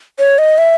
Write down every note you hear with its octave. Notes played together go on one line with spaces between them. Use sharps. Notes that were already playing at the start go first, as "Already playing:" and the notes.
C#5
D#5
E5